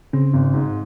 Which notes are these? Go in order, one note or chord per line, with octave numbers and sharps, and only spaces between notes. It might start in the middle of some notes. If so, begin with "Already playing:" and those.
C#3 C4 C#4
G#1
G#2